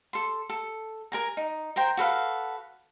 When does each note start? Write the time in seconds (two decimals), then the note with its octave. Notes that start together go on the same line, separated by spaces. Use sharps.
0.13 A4 C6
0.50 A4
1.12 A#4 G#5 A#5
1.37 D#4
1.76 A#4 C5 G5 A#5
1.97 F#4 A4 B4 F5